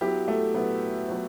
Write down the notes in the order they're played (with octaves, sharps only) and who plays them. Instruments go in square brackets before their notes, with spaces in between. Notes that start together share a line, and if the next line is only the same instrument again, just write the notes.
[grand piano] F#3 B3 E4 B4 [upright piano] G4
[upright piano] A3
[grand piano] F#3 B3 E4 B4
F#3 B3 F#4 B4